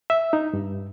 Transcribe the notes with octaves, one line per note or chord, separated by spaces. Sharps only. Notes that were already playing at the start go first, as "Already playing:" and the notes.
E5
D#4
G2